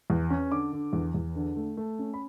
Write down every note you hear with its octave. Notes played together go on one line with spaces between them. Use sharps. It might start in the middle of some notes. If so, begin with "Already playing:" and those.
E2
C#4
D3 D6
D3
E2
E2
D3
A3
A3
C#4
B5